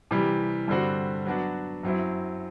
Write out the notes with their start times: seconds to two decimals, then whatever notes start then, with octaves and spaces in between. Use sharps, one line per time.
0.11 C3 E3 G3
0.68 G2 D3 G3 C4 F#4
1.26 F#3 B3 D4 F#4
1.83 F#2 F#3 C4 E4